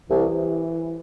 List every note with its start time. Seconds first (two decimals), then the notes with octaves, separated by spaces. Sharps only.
0.10 C2 E3